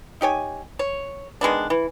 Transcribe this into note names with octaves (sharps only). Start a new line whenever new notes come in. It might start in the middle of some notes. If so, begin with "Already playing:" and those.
D#4 G4 C#5 G#5
C#5
D#3 G#3 B3 D4
E3